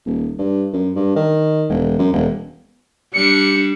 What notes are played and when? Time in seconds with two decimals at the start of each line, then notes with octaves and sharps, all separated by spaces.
0.06 D#1
0.38 G2
0.73 F#2
0.95 G2
1.16 D#3
1.70 E1
1.99 F#2
2.13 E1
3.14 G3 D4 C#7